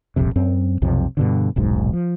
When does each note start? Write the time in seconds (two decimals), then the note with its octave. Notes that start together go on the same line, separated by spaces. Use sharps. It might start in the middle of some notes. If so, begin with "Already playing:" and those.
0.16 D#1 A#1 F2 C3
0.36 F#2 C4
0.82 B1 F2 C3
1.17 G2 B2 D3
1.56 D#1 B1 G#2
1.93 F3